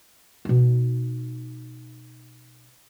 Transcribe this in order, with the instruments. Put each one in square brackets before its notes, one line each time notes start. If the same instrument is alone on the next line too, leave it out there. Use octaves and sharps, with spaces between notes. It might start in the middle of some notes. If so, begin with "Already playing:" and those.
[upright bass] B2 D#4